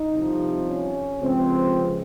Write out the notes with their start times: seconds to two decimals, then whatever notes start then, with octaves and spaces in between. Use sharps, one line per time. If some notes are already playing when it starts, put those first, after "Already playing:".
Already playing: D#4
0.14 C2 C3 F3
0.68 C#4
1.22 C#2 C3 F3 C4